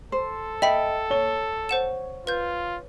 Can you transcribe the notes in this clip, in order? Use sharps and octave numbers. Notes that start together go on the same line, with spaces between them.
A4 C5
D#5 E5 G5 B5 B6
C#5 G7
C5 F#5 E7
F4 B4 G6